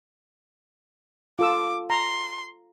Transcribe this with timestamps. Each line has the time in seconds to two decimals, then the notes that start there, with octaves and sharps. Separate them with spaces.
1.39 F4 A4 D6 E6
1.90 A#5 C6